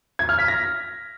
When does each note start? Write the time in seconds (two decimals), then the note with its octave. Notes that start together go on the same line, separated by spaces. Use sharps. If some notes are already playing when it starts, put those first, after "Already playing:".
0.19 G#6
0.29 F6
0.39 B6
0.48 A#6